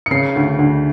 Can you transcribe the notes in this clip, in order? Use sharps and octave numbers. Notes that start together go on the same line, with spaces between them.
C#7
C#3 C7
D2
D2